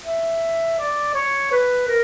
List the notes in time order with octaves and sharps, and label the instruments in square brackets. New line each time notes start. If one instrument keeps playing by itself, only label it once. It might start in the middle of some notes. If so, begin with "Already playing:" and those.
[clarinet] E5
D5
C#5
B4
A#4